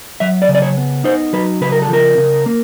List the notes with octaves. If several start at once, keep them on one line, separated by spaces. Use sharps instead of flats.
F#3 E5
D5
C#3
D5
C#5
B3
D#4 C5
F#3 B4
C#3 B4
A#4
A4
F3 A#4
C#3
A#3